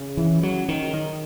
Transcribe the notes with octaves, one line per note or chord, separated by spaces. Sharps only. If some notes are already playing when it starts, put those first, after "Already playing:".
Already playing: C#3
E3
F#3
D#3
D#3